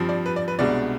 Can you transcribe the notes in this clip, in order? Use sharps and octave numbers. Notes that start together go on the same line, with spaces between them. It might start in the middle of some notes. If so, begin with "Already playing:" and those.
Already playing: G2 F3 C4
D5
B4
D5
B4
C2 B2 G#3 D4 D5